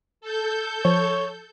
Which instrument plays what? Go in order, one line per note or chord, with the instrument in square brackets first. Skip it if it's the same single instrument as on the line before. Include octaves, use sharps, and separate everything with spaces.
[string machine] A4 G6
[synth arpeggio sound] F3 [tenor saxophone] C#5